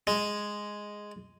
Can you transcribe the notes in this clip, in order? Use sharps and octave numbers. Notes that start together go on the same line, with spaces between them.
G#3